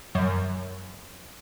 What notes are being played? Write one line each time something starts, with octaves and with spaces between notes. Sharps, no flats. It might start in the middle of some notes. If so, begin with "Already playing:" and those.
F#2